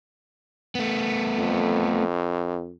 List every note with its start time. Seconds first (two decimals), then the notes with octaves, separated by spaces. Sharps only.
0.75 A3 B3
1.38 F2